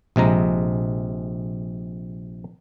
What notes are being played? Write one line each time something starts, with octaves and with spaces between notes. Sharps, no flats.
A#1 C3 G#3 A#5